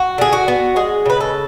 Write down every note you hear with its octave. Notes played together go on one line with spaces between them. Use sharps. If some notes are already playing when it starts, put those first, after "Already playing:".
Already playing: F#4
D3 G#4
F#4
B3
G#3 G#4
C#3 B4
A4